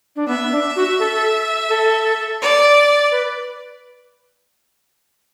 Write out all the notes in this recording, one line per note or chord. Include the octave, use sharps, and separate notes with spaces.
D4
B3 E5
D4
F#4
A4
A4
D5
B4